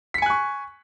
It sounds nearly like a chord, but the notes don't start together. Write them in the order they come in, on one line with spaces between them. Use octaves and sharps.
B6 C#7 G#5 F#6 C#6